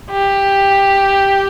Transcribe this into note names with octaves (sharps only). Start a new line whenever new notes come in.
G4